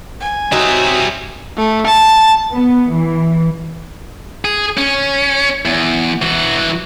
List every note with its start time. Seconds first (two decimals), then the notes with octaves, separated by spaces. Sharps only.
0.20 G#5
0.52 F#3 G3 C4 D#4 F#4 E5
1.57 A3
1.86 A5
2.51 B3
2.91 E3
4.45 G#4
4.77 C#4
5.65 E2
6.22 E3 F#4